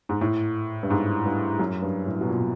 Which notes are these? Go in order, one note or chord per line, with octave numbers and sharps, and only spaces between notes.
G#2
A2
G2
G#2
G2
F#2
G2
A2
B2
A#2